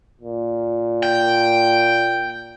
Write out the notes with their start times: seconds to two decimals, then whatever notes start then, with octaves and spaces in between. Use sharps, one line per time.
0.21 A#2
1.03 G5